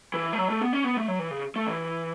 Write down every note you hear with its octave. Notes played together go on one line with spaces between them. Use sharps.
E3
A3
F#3
A3
B3
C#4
B3
A3
F#3
E3
C#3
A3
E3